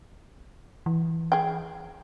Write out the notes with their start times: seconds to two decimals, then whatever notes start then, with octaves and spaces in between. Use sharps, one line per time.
0.86 E3
1.32 G#4 G5